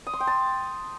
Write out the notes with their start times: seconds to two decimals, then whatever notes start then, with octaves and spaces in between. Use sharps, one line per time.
0.07 D#6
0.13 C6
0.20 G5
0.27 A5